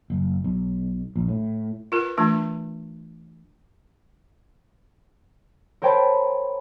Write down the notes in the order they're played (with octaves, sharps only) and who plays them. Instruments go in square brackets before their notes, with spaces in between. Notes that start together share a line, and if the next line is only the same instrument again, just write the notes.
[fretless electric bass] F#1
B1
A#1
A2
[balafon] F4 A#4 B4
E3 A3 D4 F4
[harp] A#4 C5 C#5 G5 A5 B5